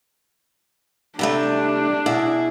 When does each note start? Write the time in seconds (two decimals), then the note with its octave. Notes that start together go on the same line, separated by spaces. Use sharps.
1.19 C3 G3 A3 D4
2.06 B2 E4 G#4